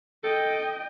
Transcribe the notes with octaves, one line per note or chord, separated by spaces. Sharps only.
A4 D#5 G5